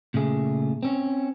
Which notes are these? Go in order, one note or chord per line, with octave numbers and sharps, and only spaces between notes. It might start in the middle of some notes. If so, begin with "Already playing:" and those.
A#2 C#3 A3 G#4
C4 C#4